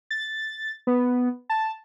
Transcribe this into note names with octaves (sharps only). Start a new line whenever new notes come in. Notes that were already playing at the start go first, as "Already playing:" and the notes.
A6
B3
A5